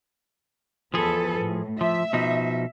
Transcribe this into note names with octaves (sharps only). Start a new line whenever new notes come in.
E2 F3 G#4 A4 B4
A2
F3 E5
B2 F3 D#4